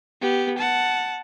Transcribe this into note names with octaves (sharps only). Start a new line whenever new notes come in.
B3 G4
F#5 A5